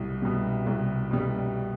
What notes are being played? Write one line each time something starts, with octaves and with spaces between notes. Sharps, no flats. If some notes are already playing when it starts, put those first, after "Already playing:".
Already playing: C2 B2 G3
B2 G3
C2
B2 G3